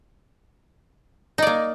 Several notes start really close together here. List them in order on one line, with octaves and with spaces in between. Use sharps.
D#4 D5 A#3